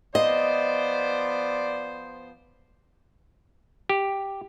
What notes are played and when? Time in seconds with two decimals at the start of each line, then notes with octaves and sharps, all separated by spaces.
0.15 F3 B3 C5 D5 D#5
3.89 G4